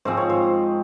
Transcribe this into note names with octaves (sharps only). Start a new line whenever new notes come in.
G#2 F3 G#3 C4 C5
C#5
C5